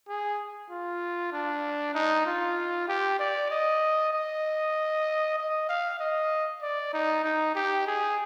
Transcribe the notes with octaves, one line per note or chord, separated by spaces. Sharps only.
G#4
F4
D4
D#4
F4
G4
D5
D#5
D#5
D#5
F5
D#5
D5
D#4
D#4
G4
G#4